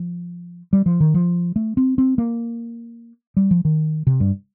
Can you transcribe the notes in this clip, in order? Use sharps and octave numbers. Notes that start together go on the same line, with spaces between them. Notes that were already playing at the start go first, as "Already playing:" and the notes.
Already playing: F3
G3
F3
D#3
F3
A3
C4
C4
A#3
G3
F3
D#3
C3
G2